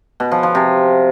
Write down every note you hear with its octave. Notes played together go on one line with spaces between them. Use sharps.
B2
F3
F3
C3